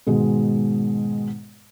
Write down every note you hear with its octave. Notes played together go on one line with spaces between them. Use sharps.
G#2 B2 D#3 G#3